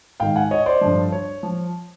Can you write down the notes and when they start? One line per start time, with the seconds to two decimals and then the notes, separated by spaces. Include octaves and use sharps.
0.20 G#2 D#3 F5 G5
0.36 F#5 G#5
0.51 C#5 D#5
0.66 C5 D5
0.81 G2 D3 F3
1.12 C#5
1.43 F3